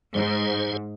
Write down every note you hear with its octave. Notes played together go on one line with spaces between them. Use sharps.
G#2 G#4 C5